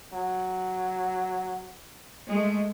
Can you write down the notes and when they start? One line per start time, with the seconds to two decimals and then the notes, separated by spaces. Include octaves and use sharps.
0.14 F#3
2.28 G#3 A3